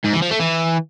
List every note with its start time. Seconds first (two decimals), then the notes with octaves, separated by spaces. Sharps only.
0.05 G#2
0.14 E3
0.22 F3
0.31 A3
0.40 E3